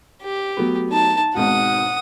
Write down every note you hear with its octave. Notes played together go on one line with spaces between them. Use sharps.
G4
F#3 A3 B3
D#4 A5
G#1 G#2 B2 F#5 D#6